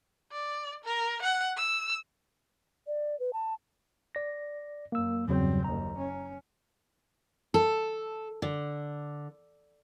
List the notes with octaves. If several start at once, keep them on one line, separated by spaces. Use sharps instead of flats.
D5
A#4
F#5
E6
D5
B4
A5
D5 A#6
F#2 A#3 E6
E2 G2 C#3 F#3 C4
F#1 D#2 A#5
C#4
A4
D3